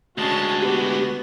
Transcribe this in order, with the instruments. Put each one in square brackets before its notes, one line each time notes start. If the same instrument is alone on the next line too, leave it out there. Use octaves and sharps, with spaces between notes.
[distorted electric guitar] D2 G#3 [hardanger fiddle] C#4 A5 [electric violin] F#4
[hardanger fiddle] B3 [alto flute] G4